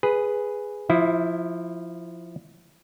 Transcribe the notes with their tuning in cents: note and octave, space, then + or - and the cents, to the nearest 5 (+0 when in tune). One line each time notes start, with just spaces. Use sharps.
G#4 +0 B4 +0
F3 +0 E4 +0 E5 -40